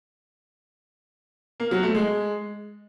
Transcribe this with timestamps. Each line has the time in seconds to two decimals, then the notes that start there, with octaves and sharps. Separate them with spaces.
1.60 A#3
1.71 F#3
1.83 A3
1.95 G#3